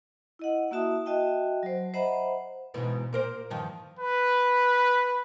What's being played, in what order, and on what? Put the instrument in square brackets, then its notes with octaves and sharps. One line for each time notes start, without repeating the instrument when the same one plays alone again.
[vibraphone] E4 D#5 F#5
A#3 E4 F#4 E5 A5 D#6
F#4 D#5 E5 G5 A5
F#3 C5
C5 D#5 E5 F#5 A#5 B5
[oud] G#2 B2 E3
A#2 A#4 C5
G2 D#3 F3
[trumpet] B4